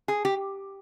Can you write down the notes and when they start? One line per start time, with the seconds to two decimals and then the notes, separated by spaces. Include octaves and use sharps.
0.08 G#4
0.25 G4